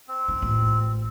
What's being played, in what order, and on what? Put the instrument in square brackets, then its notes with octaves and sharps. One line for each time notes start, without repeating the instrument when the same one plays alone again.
[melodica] C4
[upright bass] E4
A1 F4